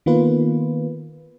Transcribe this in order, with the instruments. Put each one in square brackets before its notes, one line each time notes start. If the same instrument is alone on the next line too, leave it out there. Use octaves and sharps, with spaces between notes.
[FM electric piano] D#3 A#3 B3 F4 B4